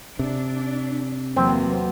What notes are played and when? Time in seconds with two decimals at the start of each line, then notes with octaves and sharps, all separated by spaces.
0.19 C3 D4
1.36 E2 F#3 A#3 C4